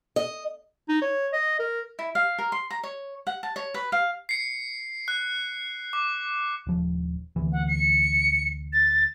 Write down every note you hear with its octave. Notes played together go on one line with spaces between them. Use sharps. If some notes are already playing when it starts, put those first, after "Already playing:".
D#5
D#4
C#5
D#5
A#4
E4
F5
A#4
C6
A#5
C#5
F#5
A5
C#5
B4
F5
C7 C#7
F#6
D6
D#1 F3
D2 E3
F#5
C#7
A6